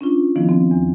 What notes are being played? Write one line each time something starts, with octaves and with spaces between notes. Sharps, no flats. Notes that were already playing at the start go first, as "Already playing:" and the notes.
C#4 D4 F4
D#3 F3 B3 E4
C4
E2